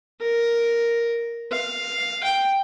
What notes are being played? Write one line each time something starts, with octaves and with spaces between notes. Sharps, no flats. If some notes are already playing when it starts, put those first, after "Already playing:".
A#4
F5
G5